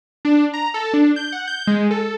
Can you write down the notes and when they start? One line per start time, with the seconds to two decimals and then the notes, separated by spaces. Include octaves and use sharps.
0.25 D4
0.53 A#5
0.74 A4
0.93 D4
1.16 G6
1.32 F#5
1.47 G6
1.67 G#3
1.91 A4